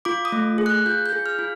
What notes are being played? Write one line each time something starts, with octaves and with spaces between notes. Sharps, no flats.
F4 D6
D#6
A3
G#4
F#6
F4 G6
G6
G#4
F6
F4